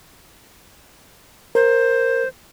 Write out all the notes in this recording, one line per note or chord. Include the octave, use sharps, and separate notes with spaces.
A#4 C5